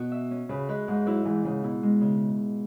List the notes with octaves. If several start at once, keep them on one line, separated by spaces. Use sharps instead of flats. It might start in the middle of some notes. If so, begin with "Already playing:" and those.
Already playing: B2 C#4 F#4
E5
C#4
C#3 B4
G#3 B4
G#2 G#3
F#3 E4
G#2 E3
G#2 C#3
B2 E4
G#3
C#3